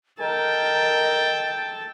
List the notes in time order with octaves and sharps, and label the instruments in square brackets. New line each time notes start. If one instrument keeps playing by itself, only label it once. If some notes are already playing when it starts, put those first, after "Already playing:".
[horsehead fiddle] A4 A5 [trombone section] A#4 [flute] D#5 [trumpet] G5